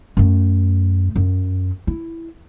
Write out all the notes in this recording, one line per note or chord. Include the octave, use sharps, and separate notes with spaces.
F#2 A3
F#2
E4